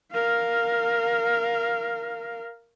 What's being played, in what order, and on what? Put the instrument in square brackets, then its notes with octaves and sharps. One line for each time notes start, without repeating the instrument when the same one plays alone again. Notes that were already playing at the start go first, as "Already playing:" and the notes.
[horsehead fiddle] A#4 F5